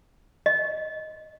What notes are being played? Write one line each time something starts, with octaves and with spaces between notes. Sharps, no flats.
D#5